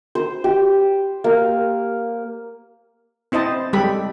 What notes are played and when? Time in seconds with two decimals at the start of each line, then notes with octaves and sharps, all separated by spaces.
0.15 C5
0.44 G4
1.24 A#3
3.32 C4 E4 C5 D#5 A5
3.73 G3 G#3 G4 A4 B5